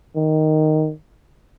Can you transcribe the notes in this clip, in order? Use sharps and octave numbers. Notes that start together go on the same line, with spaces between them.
D#3